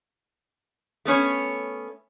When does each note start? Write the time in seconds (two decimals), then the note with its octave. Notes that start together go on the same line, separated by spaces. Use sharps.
1.05 A3 B3 C#4 C#5